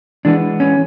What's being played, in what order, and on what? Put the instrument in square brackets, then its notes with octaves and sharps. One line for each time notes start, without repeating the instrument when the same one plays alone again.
[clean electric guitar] E3 G#3 B3 D4
C#4